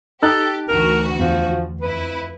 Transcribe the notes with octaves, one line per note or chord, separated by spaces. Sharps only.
D#4 G4 A4 A5 F#6
D2 E3 F#4 A#4
E2 F3
F2 E4 B4